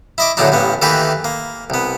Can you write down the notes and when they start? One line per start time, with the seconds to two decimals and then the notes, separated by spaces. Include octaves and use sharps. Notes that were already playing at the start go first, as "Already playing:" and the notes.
0.18 E4 D#5 D6
0.37 E2 A2 D3 F#3 D4 D#4
0.52 A1 G2 A#3 B3
0.82 D#3 E3 A3 A#3 G4 B4
1.24 A#3
1.70 C2 B3